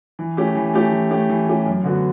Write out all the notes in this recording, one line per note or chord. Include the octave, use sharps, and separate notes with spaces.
E3
A3 C#4 G4
E3
A3 C#4 G4
E3
A3 C#4 G4
E3
A3 C#4 G4
F#2
D3 F#3 B3 F#4